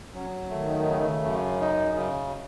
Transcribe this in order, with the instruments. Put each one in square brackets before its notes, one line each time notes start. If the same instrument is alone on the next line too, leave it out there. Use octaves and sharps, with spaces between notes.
[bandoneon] F#3 [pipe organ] C#4
[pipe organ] D#3 [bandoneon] A3
[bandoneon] C#3
F#2
D#4
C#3